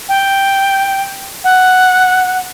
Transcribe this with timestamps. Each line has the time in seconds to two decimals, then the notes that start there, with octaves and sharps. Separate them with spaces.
0.09 G5
1.44 F#5